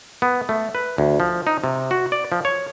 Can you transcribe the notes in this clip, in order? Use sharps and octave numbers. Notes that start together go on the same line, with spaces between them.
B3
A3
B4
D2
F3
D#4
C3
F#4
D5
F3
C#5